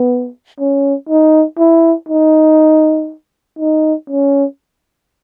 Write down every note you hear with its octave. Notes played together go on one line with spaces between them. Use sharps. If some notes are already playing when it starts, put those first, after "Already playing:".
Already playing: B3
C#4
D#4
E4
D#4
D#4
C#4